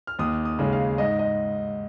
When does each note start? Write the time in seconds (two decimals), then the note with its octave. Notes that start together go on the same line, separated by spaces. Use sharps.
0.07 F6
0.19 D#2 D#6
0.45 D#6
0.59 C#3 G#3
0.73 F5
0.98 G#2 D#5
1.19 D#5